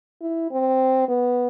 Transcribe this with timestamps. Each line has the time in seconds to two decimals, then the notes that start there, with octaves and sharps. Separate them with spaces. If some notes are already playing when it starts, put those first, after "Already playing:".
0.21 E4
0.51 C4
1.08 B3